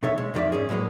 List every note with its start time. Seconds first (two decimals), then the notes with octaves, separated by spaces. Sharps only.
0.03 B2 D#3 A4 C#5 E5
0.18 G#3
0.34 F2 D#3 D#4 G4 D5 E5
0.52 G#2 C#4 G#4
0.69 A2 F#3 G#3 A#3 B3